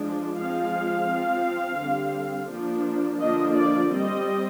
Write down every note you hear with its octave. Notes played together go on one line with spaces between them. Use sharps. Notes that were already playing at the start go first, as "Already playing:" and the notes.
Already playing: F3 G#3 D4
F3 G#3 C4 F5
F3 C4
D3 G3 C4
F3 A#3 D4
D3 F3 A#3 D4 D#5
D5
G3 C4 D#5